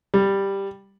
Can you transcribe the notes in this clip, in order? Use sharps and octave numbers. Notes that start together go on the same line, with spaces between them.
G3